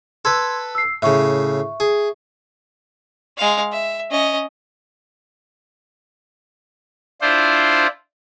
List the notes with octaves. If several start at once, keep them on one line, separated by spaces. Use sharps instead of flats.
A4 B4 C6 E6 G#6
E6 C7
A2 C#3 E5 C#6
G#4
G#3 F5
E5
C#4 D#5
D4 E4 F4 C5